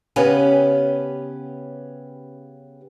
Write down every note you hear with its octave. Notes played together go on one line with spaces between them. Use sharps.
C#3 B3 C#4 G4 B4